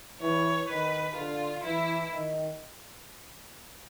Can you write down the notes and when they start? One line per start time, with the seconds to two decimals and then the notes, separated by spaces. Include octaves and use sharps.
0.20 E3 C#5
0.68 D#3 B4
1.15 D3 F4
1.63 E3 E4
2.12 D#3